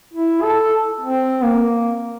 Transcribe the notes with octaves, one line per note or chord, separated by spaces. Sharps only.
E4
A4
C4
A#3